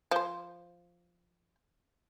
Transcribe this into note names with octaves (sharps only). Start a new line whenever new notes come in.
F3 C5